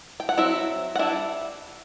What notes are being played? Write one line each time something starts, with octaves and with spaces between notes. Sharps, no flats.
G5
F#5
F#3 C4 E4 E5
F#5
G3 D4 E4 E5